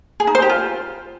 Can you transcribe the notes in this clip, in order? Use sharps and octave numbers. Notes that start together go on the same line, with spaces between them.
G#4
D#4
C5
G4
F4